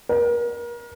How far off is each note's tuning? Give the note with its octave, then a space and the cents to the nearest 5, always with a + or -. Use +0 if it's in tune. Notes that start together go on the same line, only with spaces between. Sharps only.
A#4 +35